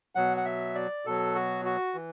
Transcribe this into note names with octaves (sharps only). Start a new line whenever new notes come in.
B2 F#3 F#5
F#5
E5
D5
B2 F#3 A4
F#4
F#4
E3